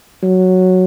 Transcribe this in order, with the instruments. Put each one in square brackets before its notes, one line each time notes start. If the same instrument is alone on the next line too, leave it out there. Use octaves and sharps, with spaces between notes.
[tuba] F#3